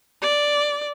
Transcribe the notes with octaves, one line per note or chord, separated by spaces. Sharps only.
D5